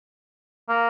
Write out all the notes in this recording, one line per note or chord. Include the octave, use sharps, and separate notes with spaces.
A#3